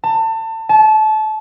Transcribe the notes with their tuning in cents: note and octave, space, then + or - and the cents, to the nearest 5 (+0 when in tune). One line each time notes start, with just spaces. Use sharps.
A5 +30
A5 -25